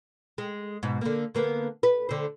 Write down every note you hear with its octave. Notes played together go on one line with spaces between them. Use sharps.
G#3
G#2 B2
D3 A#3
D3 A#3 B3
B4
D3 C5